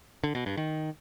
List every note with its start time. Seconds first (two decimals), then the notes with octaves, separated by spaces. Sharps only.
0.24 D3
0.35 B2
0.46 G2
0.57 D#3